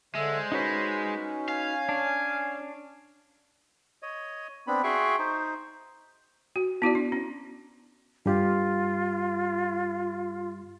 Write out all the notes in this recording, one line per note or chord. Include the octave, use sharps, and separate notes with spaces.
D3 G#3 C5 E5
C#4 D#4 F#4 B4
F5 G#5
D4
C#5 D#5
B3 C4 D4 B5
F#4 G#4 E5 G5 C6 C#6
D#4 C5
F#4
B3 E4 F#4 D5
D4
C#4
G2 G3 F4 G4